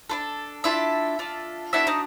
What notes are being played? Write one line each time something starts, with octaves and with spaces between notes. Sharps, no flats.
D4 F4 A4
D4 E4 F4 A4 E5
D4 F4 A4
B3 D4 E4 F#4 A4 E5
D#4 D#5